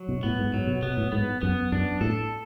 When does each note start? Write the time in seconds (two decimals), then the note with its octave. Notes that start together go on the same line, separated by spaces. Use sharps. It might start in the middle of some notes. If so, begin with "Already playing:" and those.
Already playing: F#3
0.09 B2
0.23 A2 B3
0.39 G#2
0.53 G#2 F#3
0.67 B2
0.82 B2 B3
0.97 A2
1.12 G#2 B3
1.41 F#2 B3
1.72 F#2 D4
2.01 A2 A4